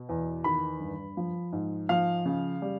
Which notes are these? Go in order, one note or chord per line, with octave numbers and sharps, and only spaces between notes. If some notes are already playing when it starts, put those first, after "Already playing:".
Already playing: B2
E2
D#3 B5
G2
F3
G#2
F3 F5
C#3
G3